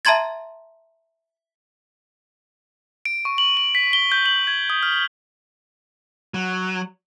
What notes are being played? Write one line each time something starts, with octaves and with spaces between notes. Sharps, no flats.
E5 A5 A#5 C6 G#6 A6
D7
C#6
F#7
F#7
B6
G7
G6
F#7
G#6
D#6
F6
F#3